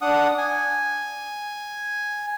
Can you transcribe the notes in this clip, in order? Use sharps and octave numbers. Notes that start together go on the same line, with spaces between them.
D4 F#5 D#6
G#5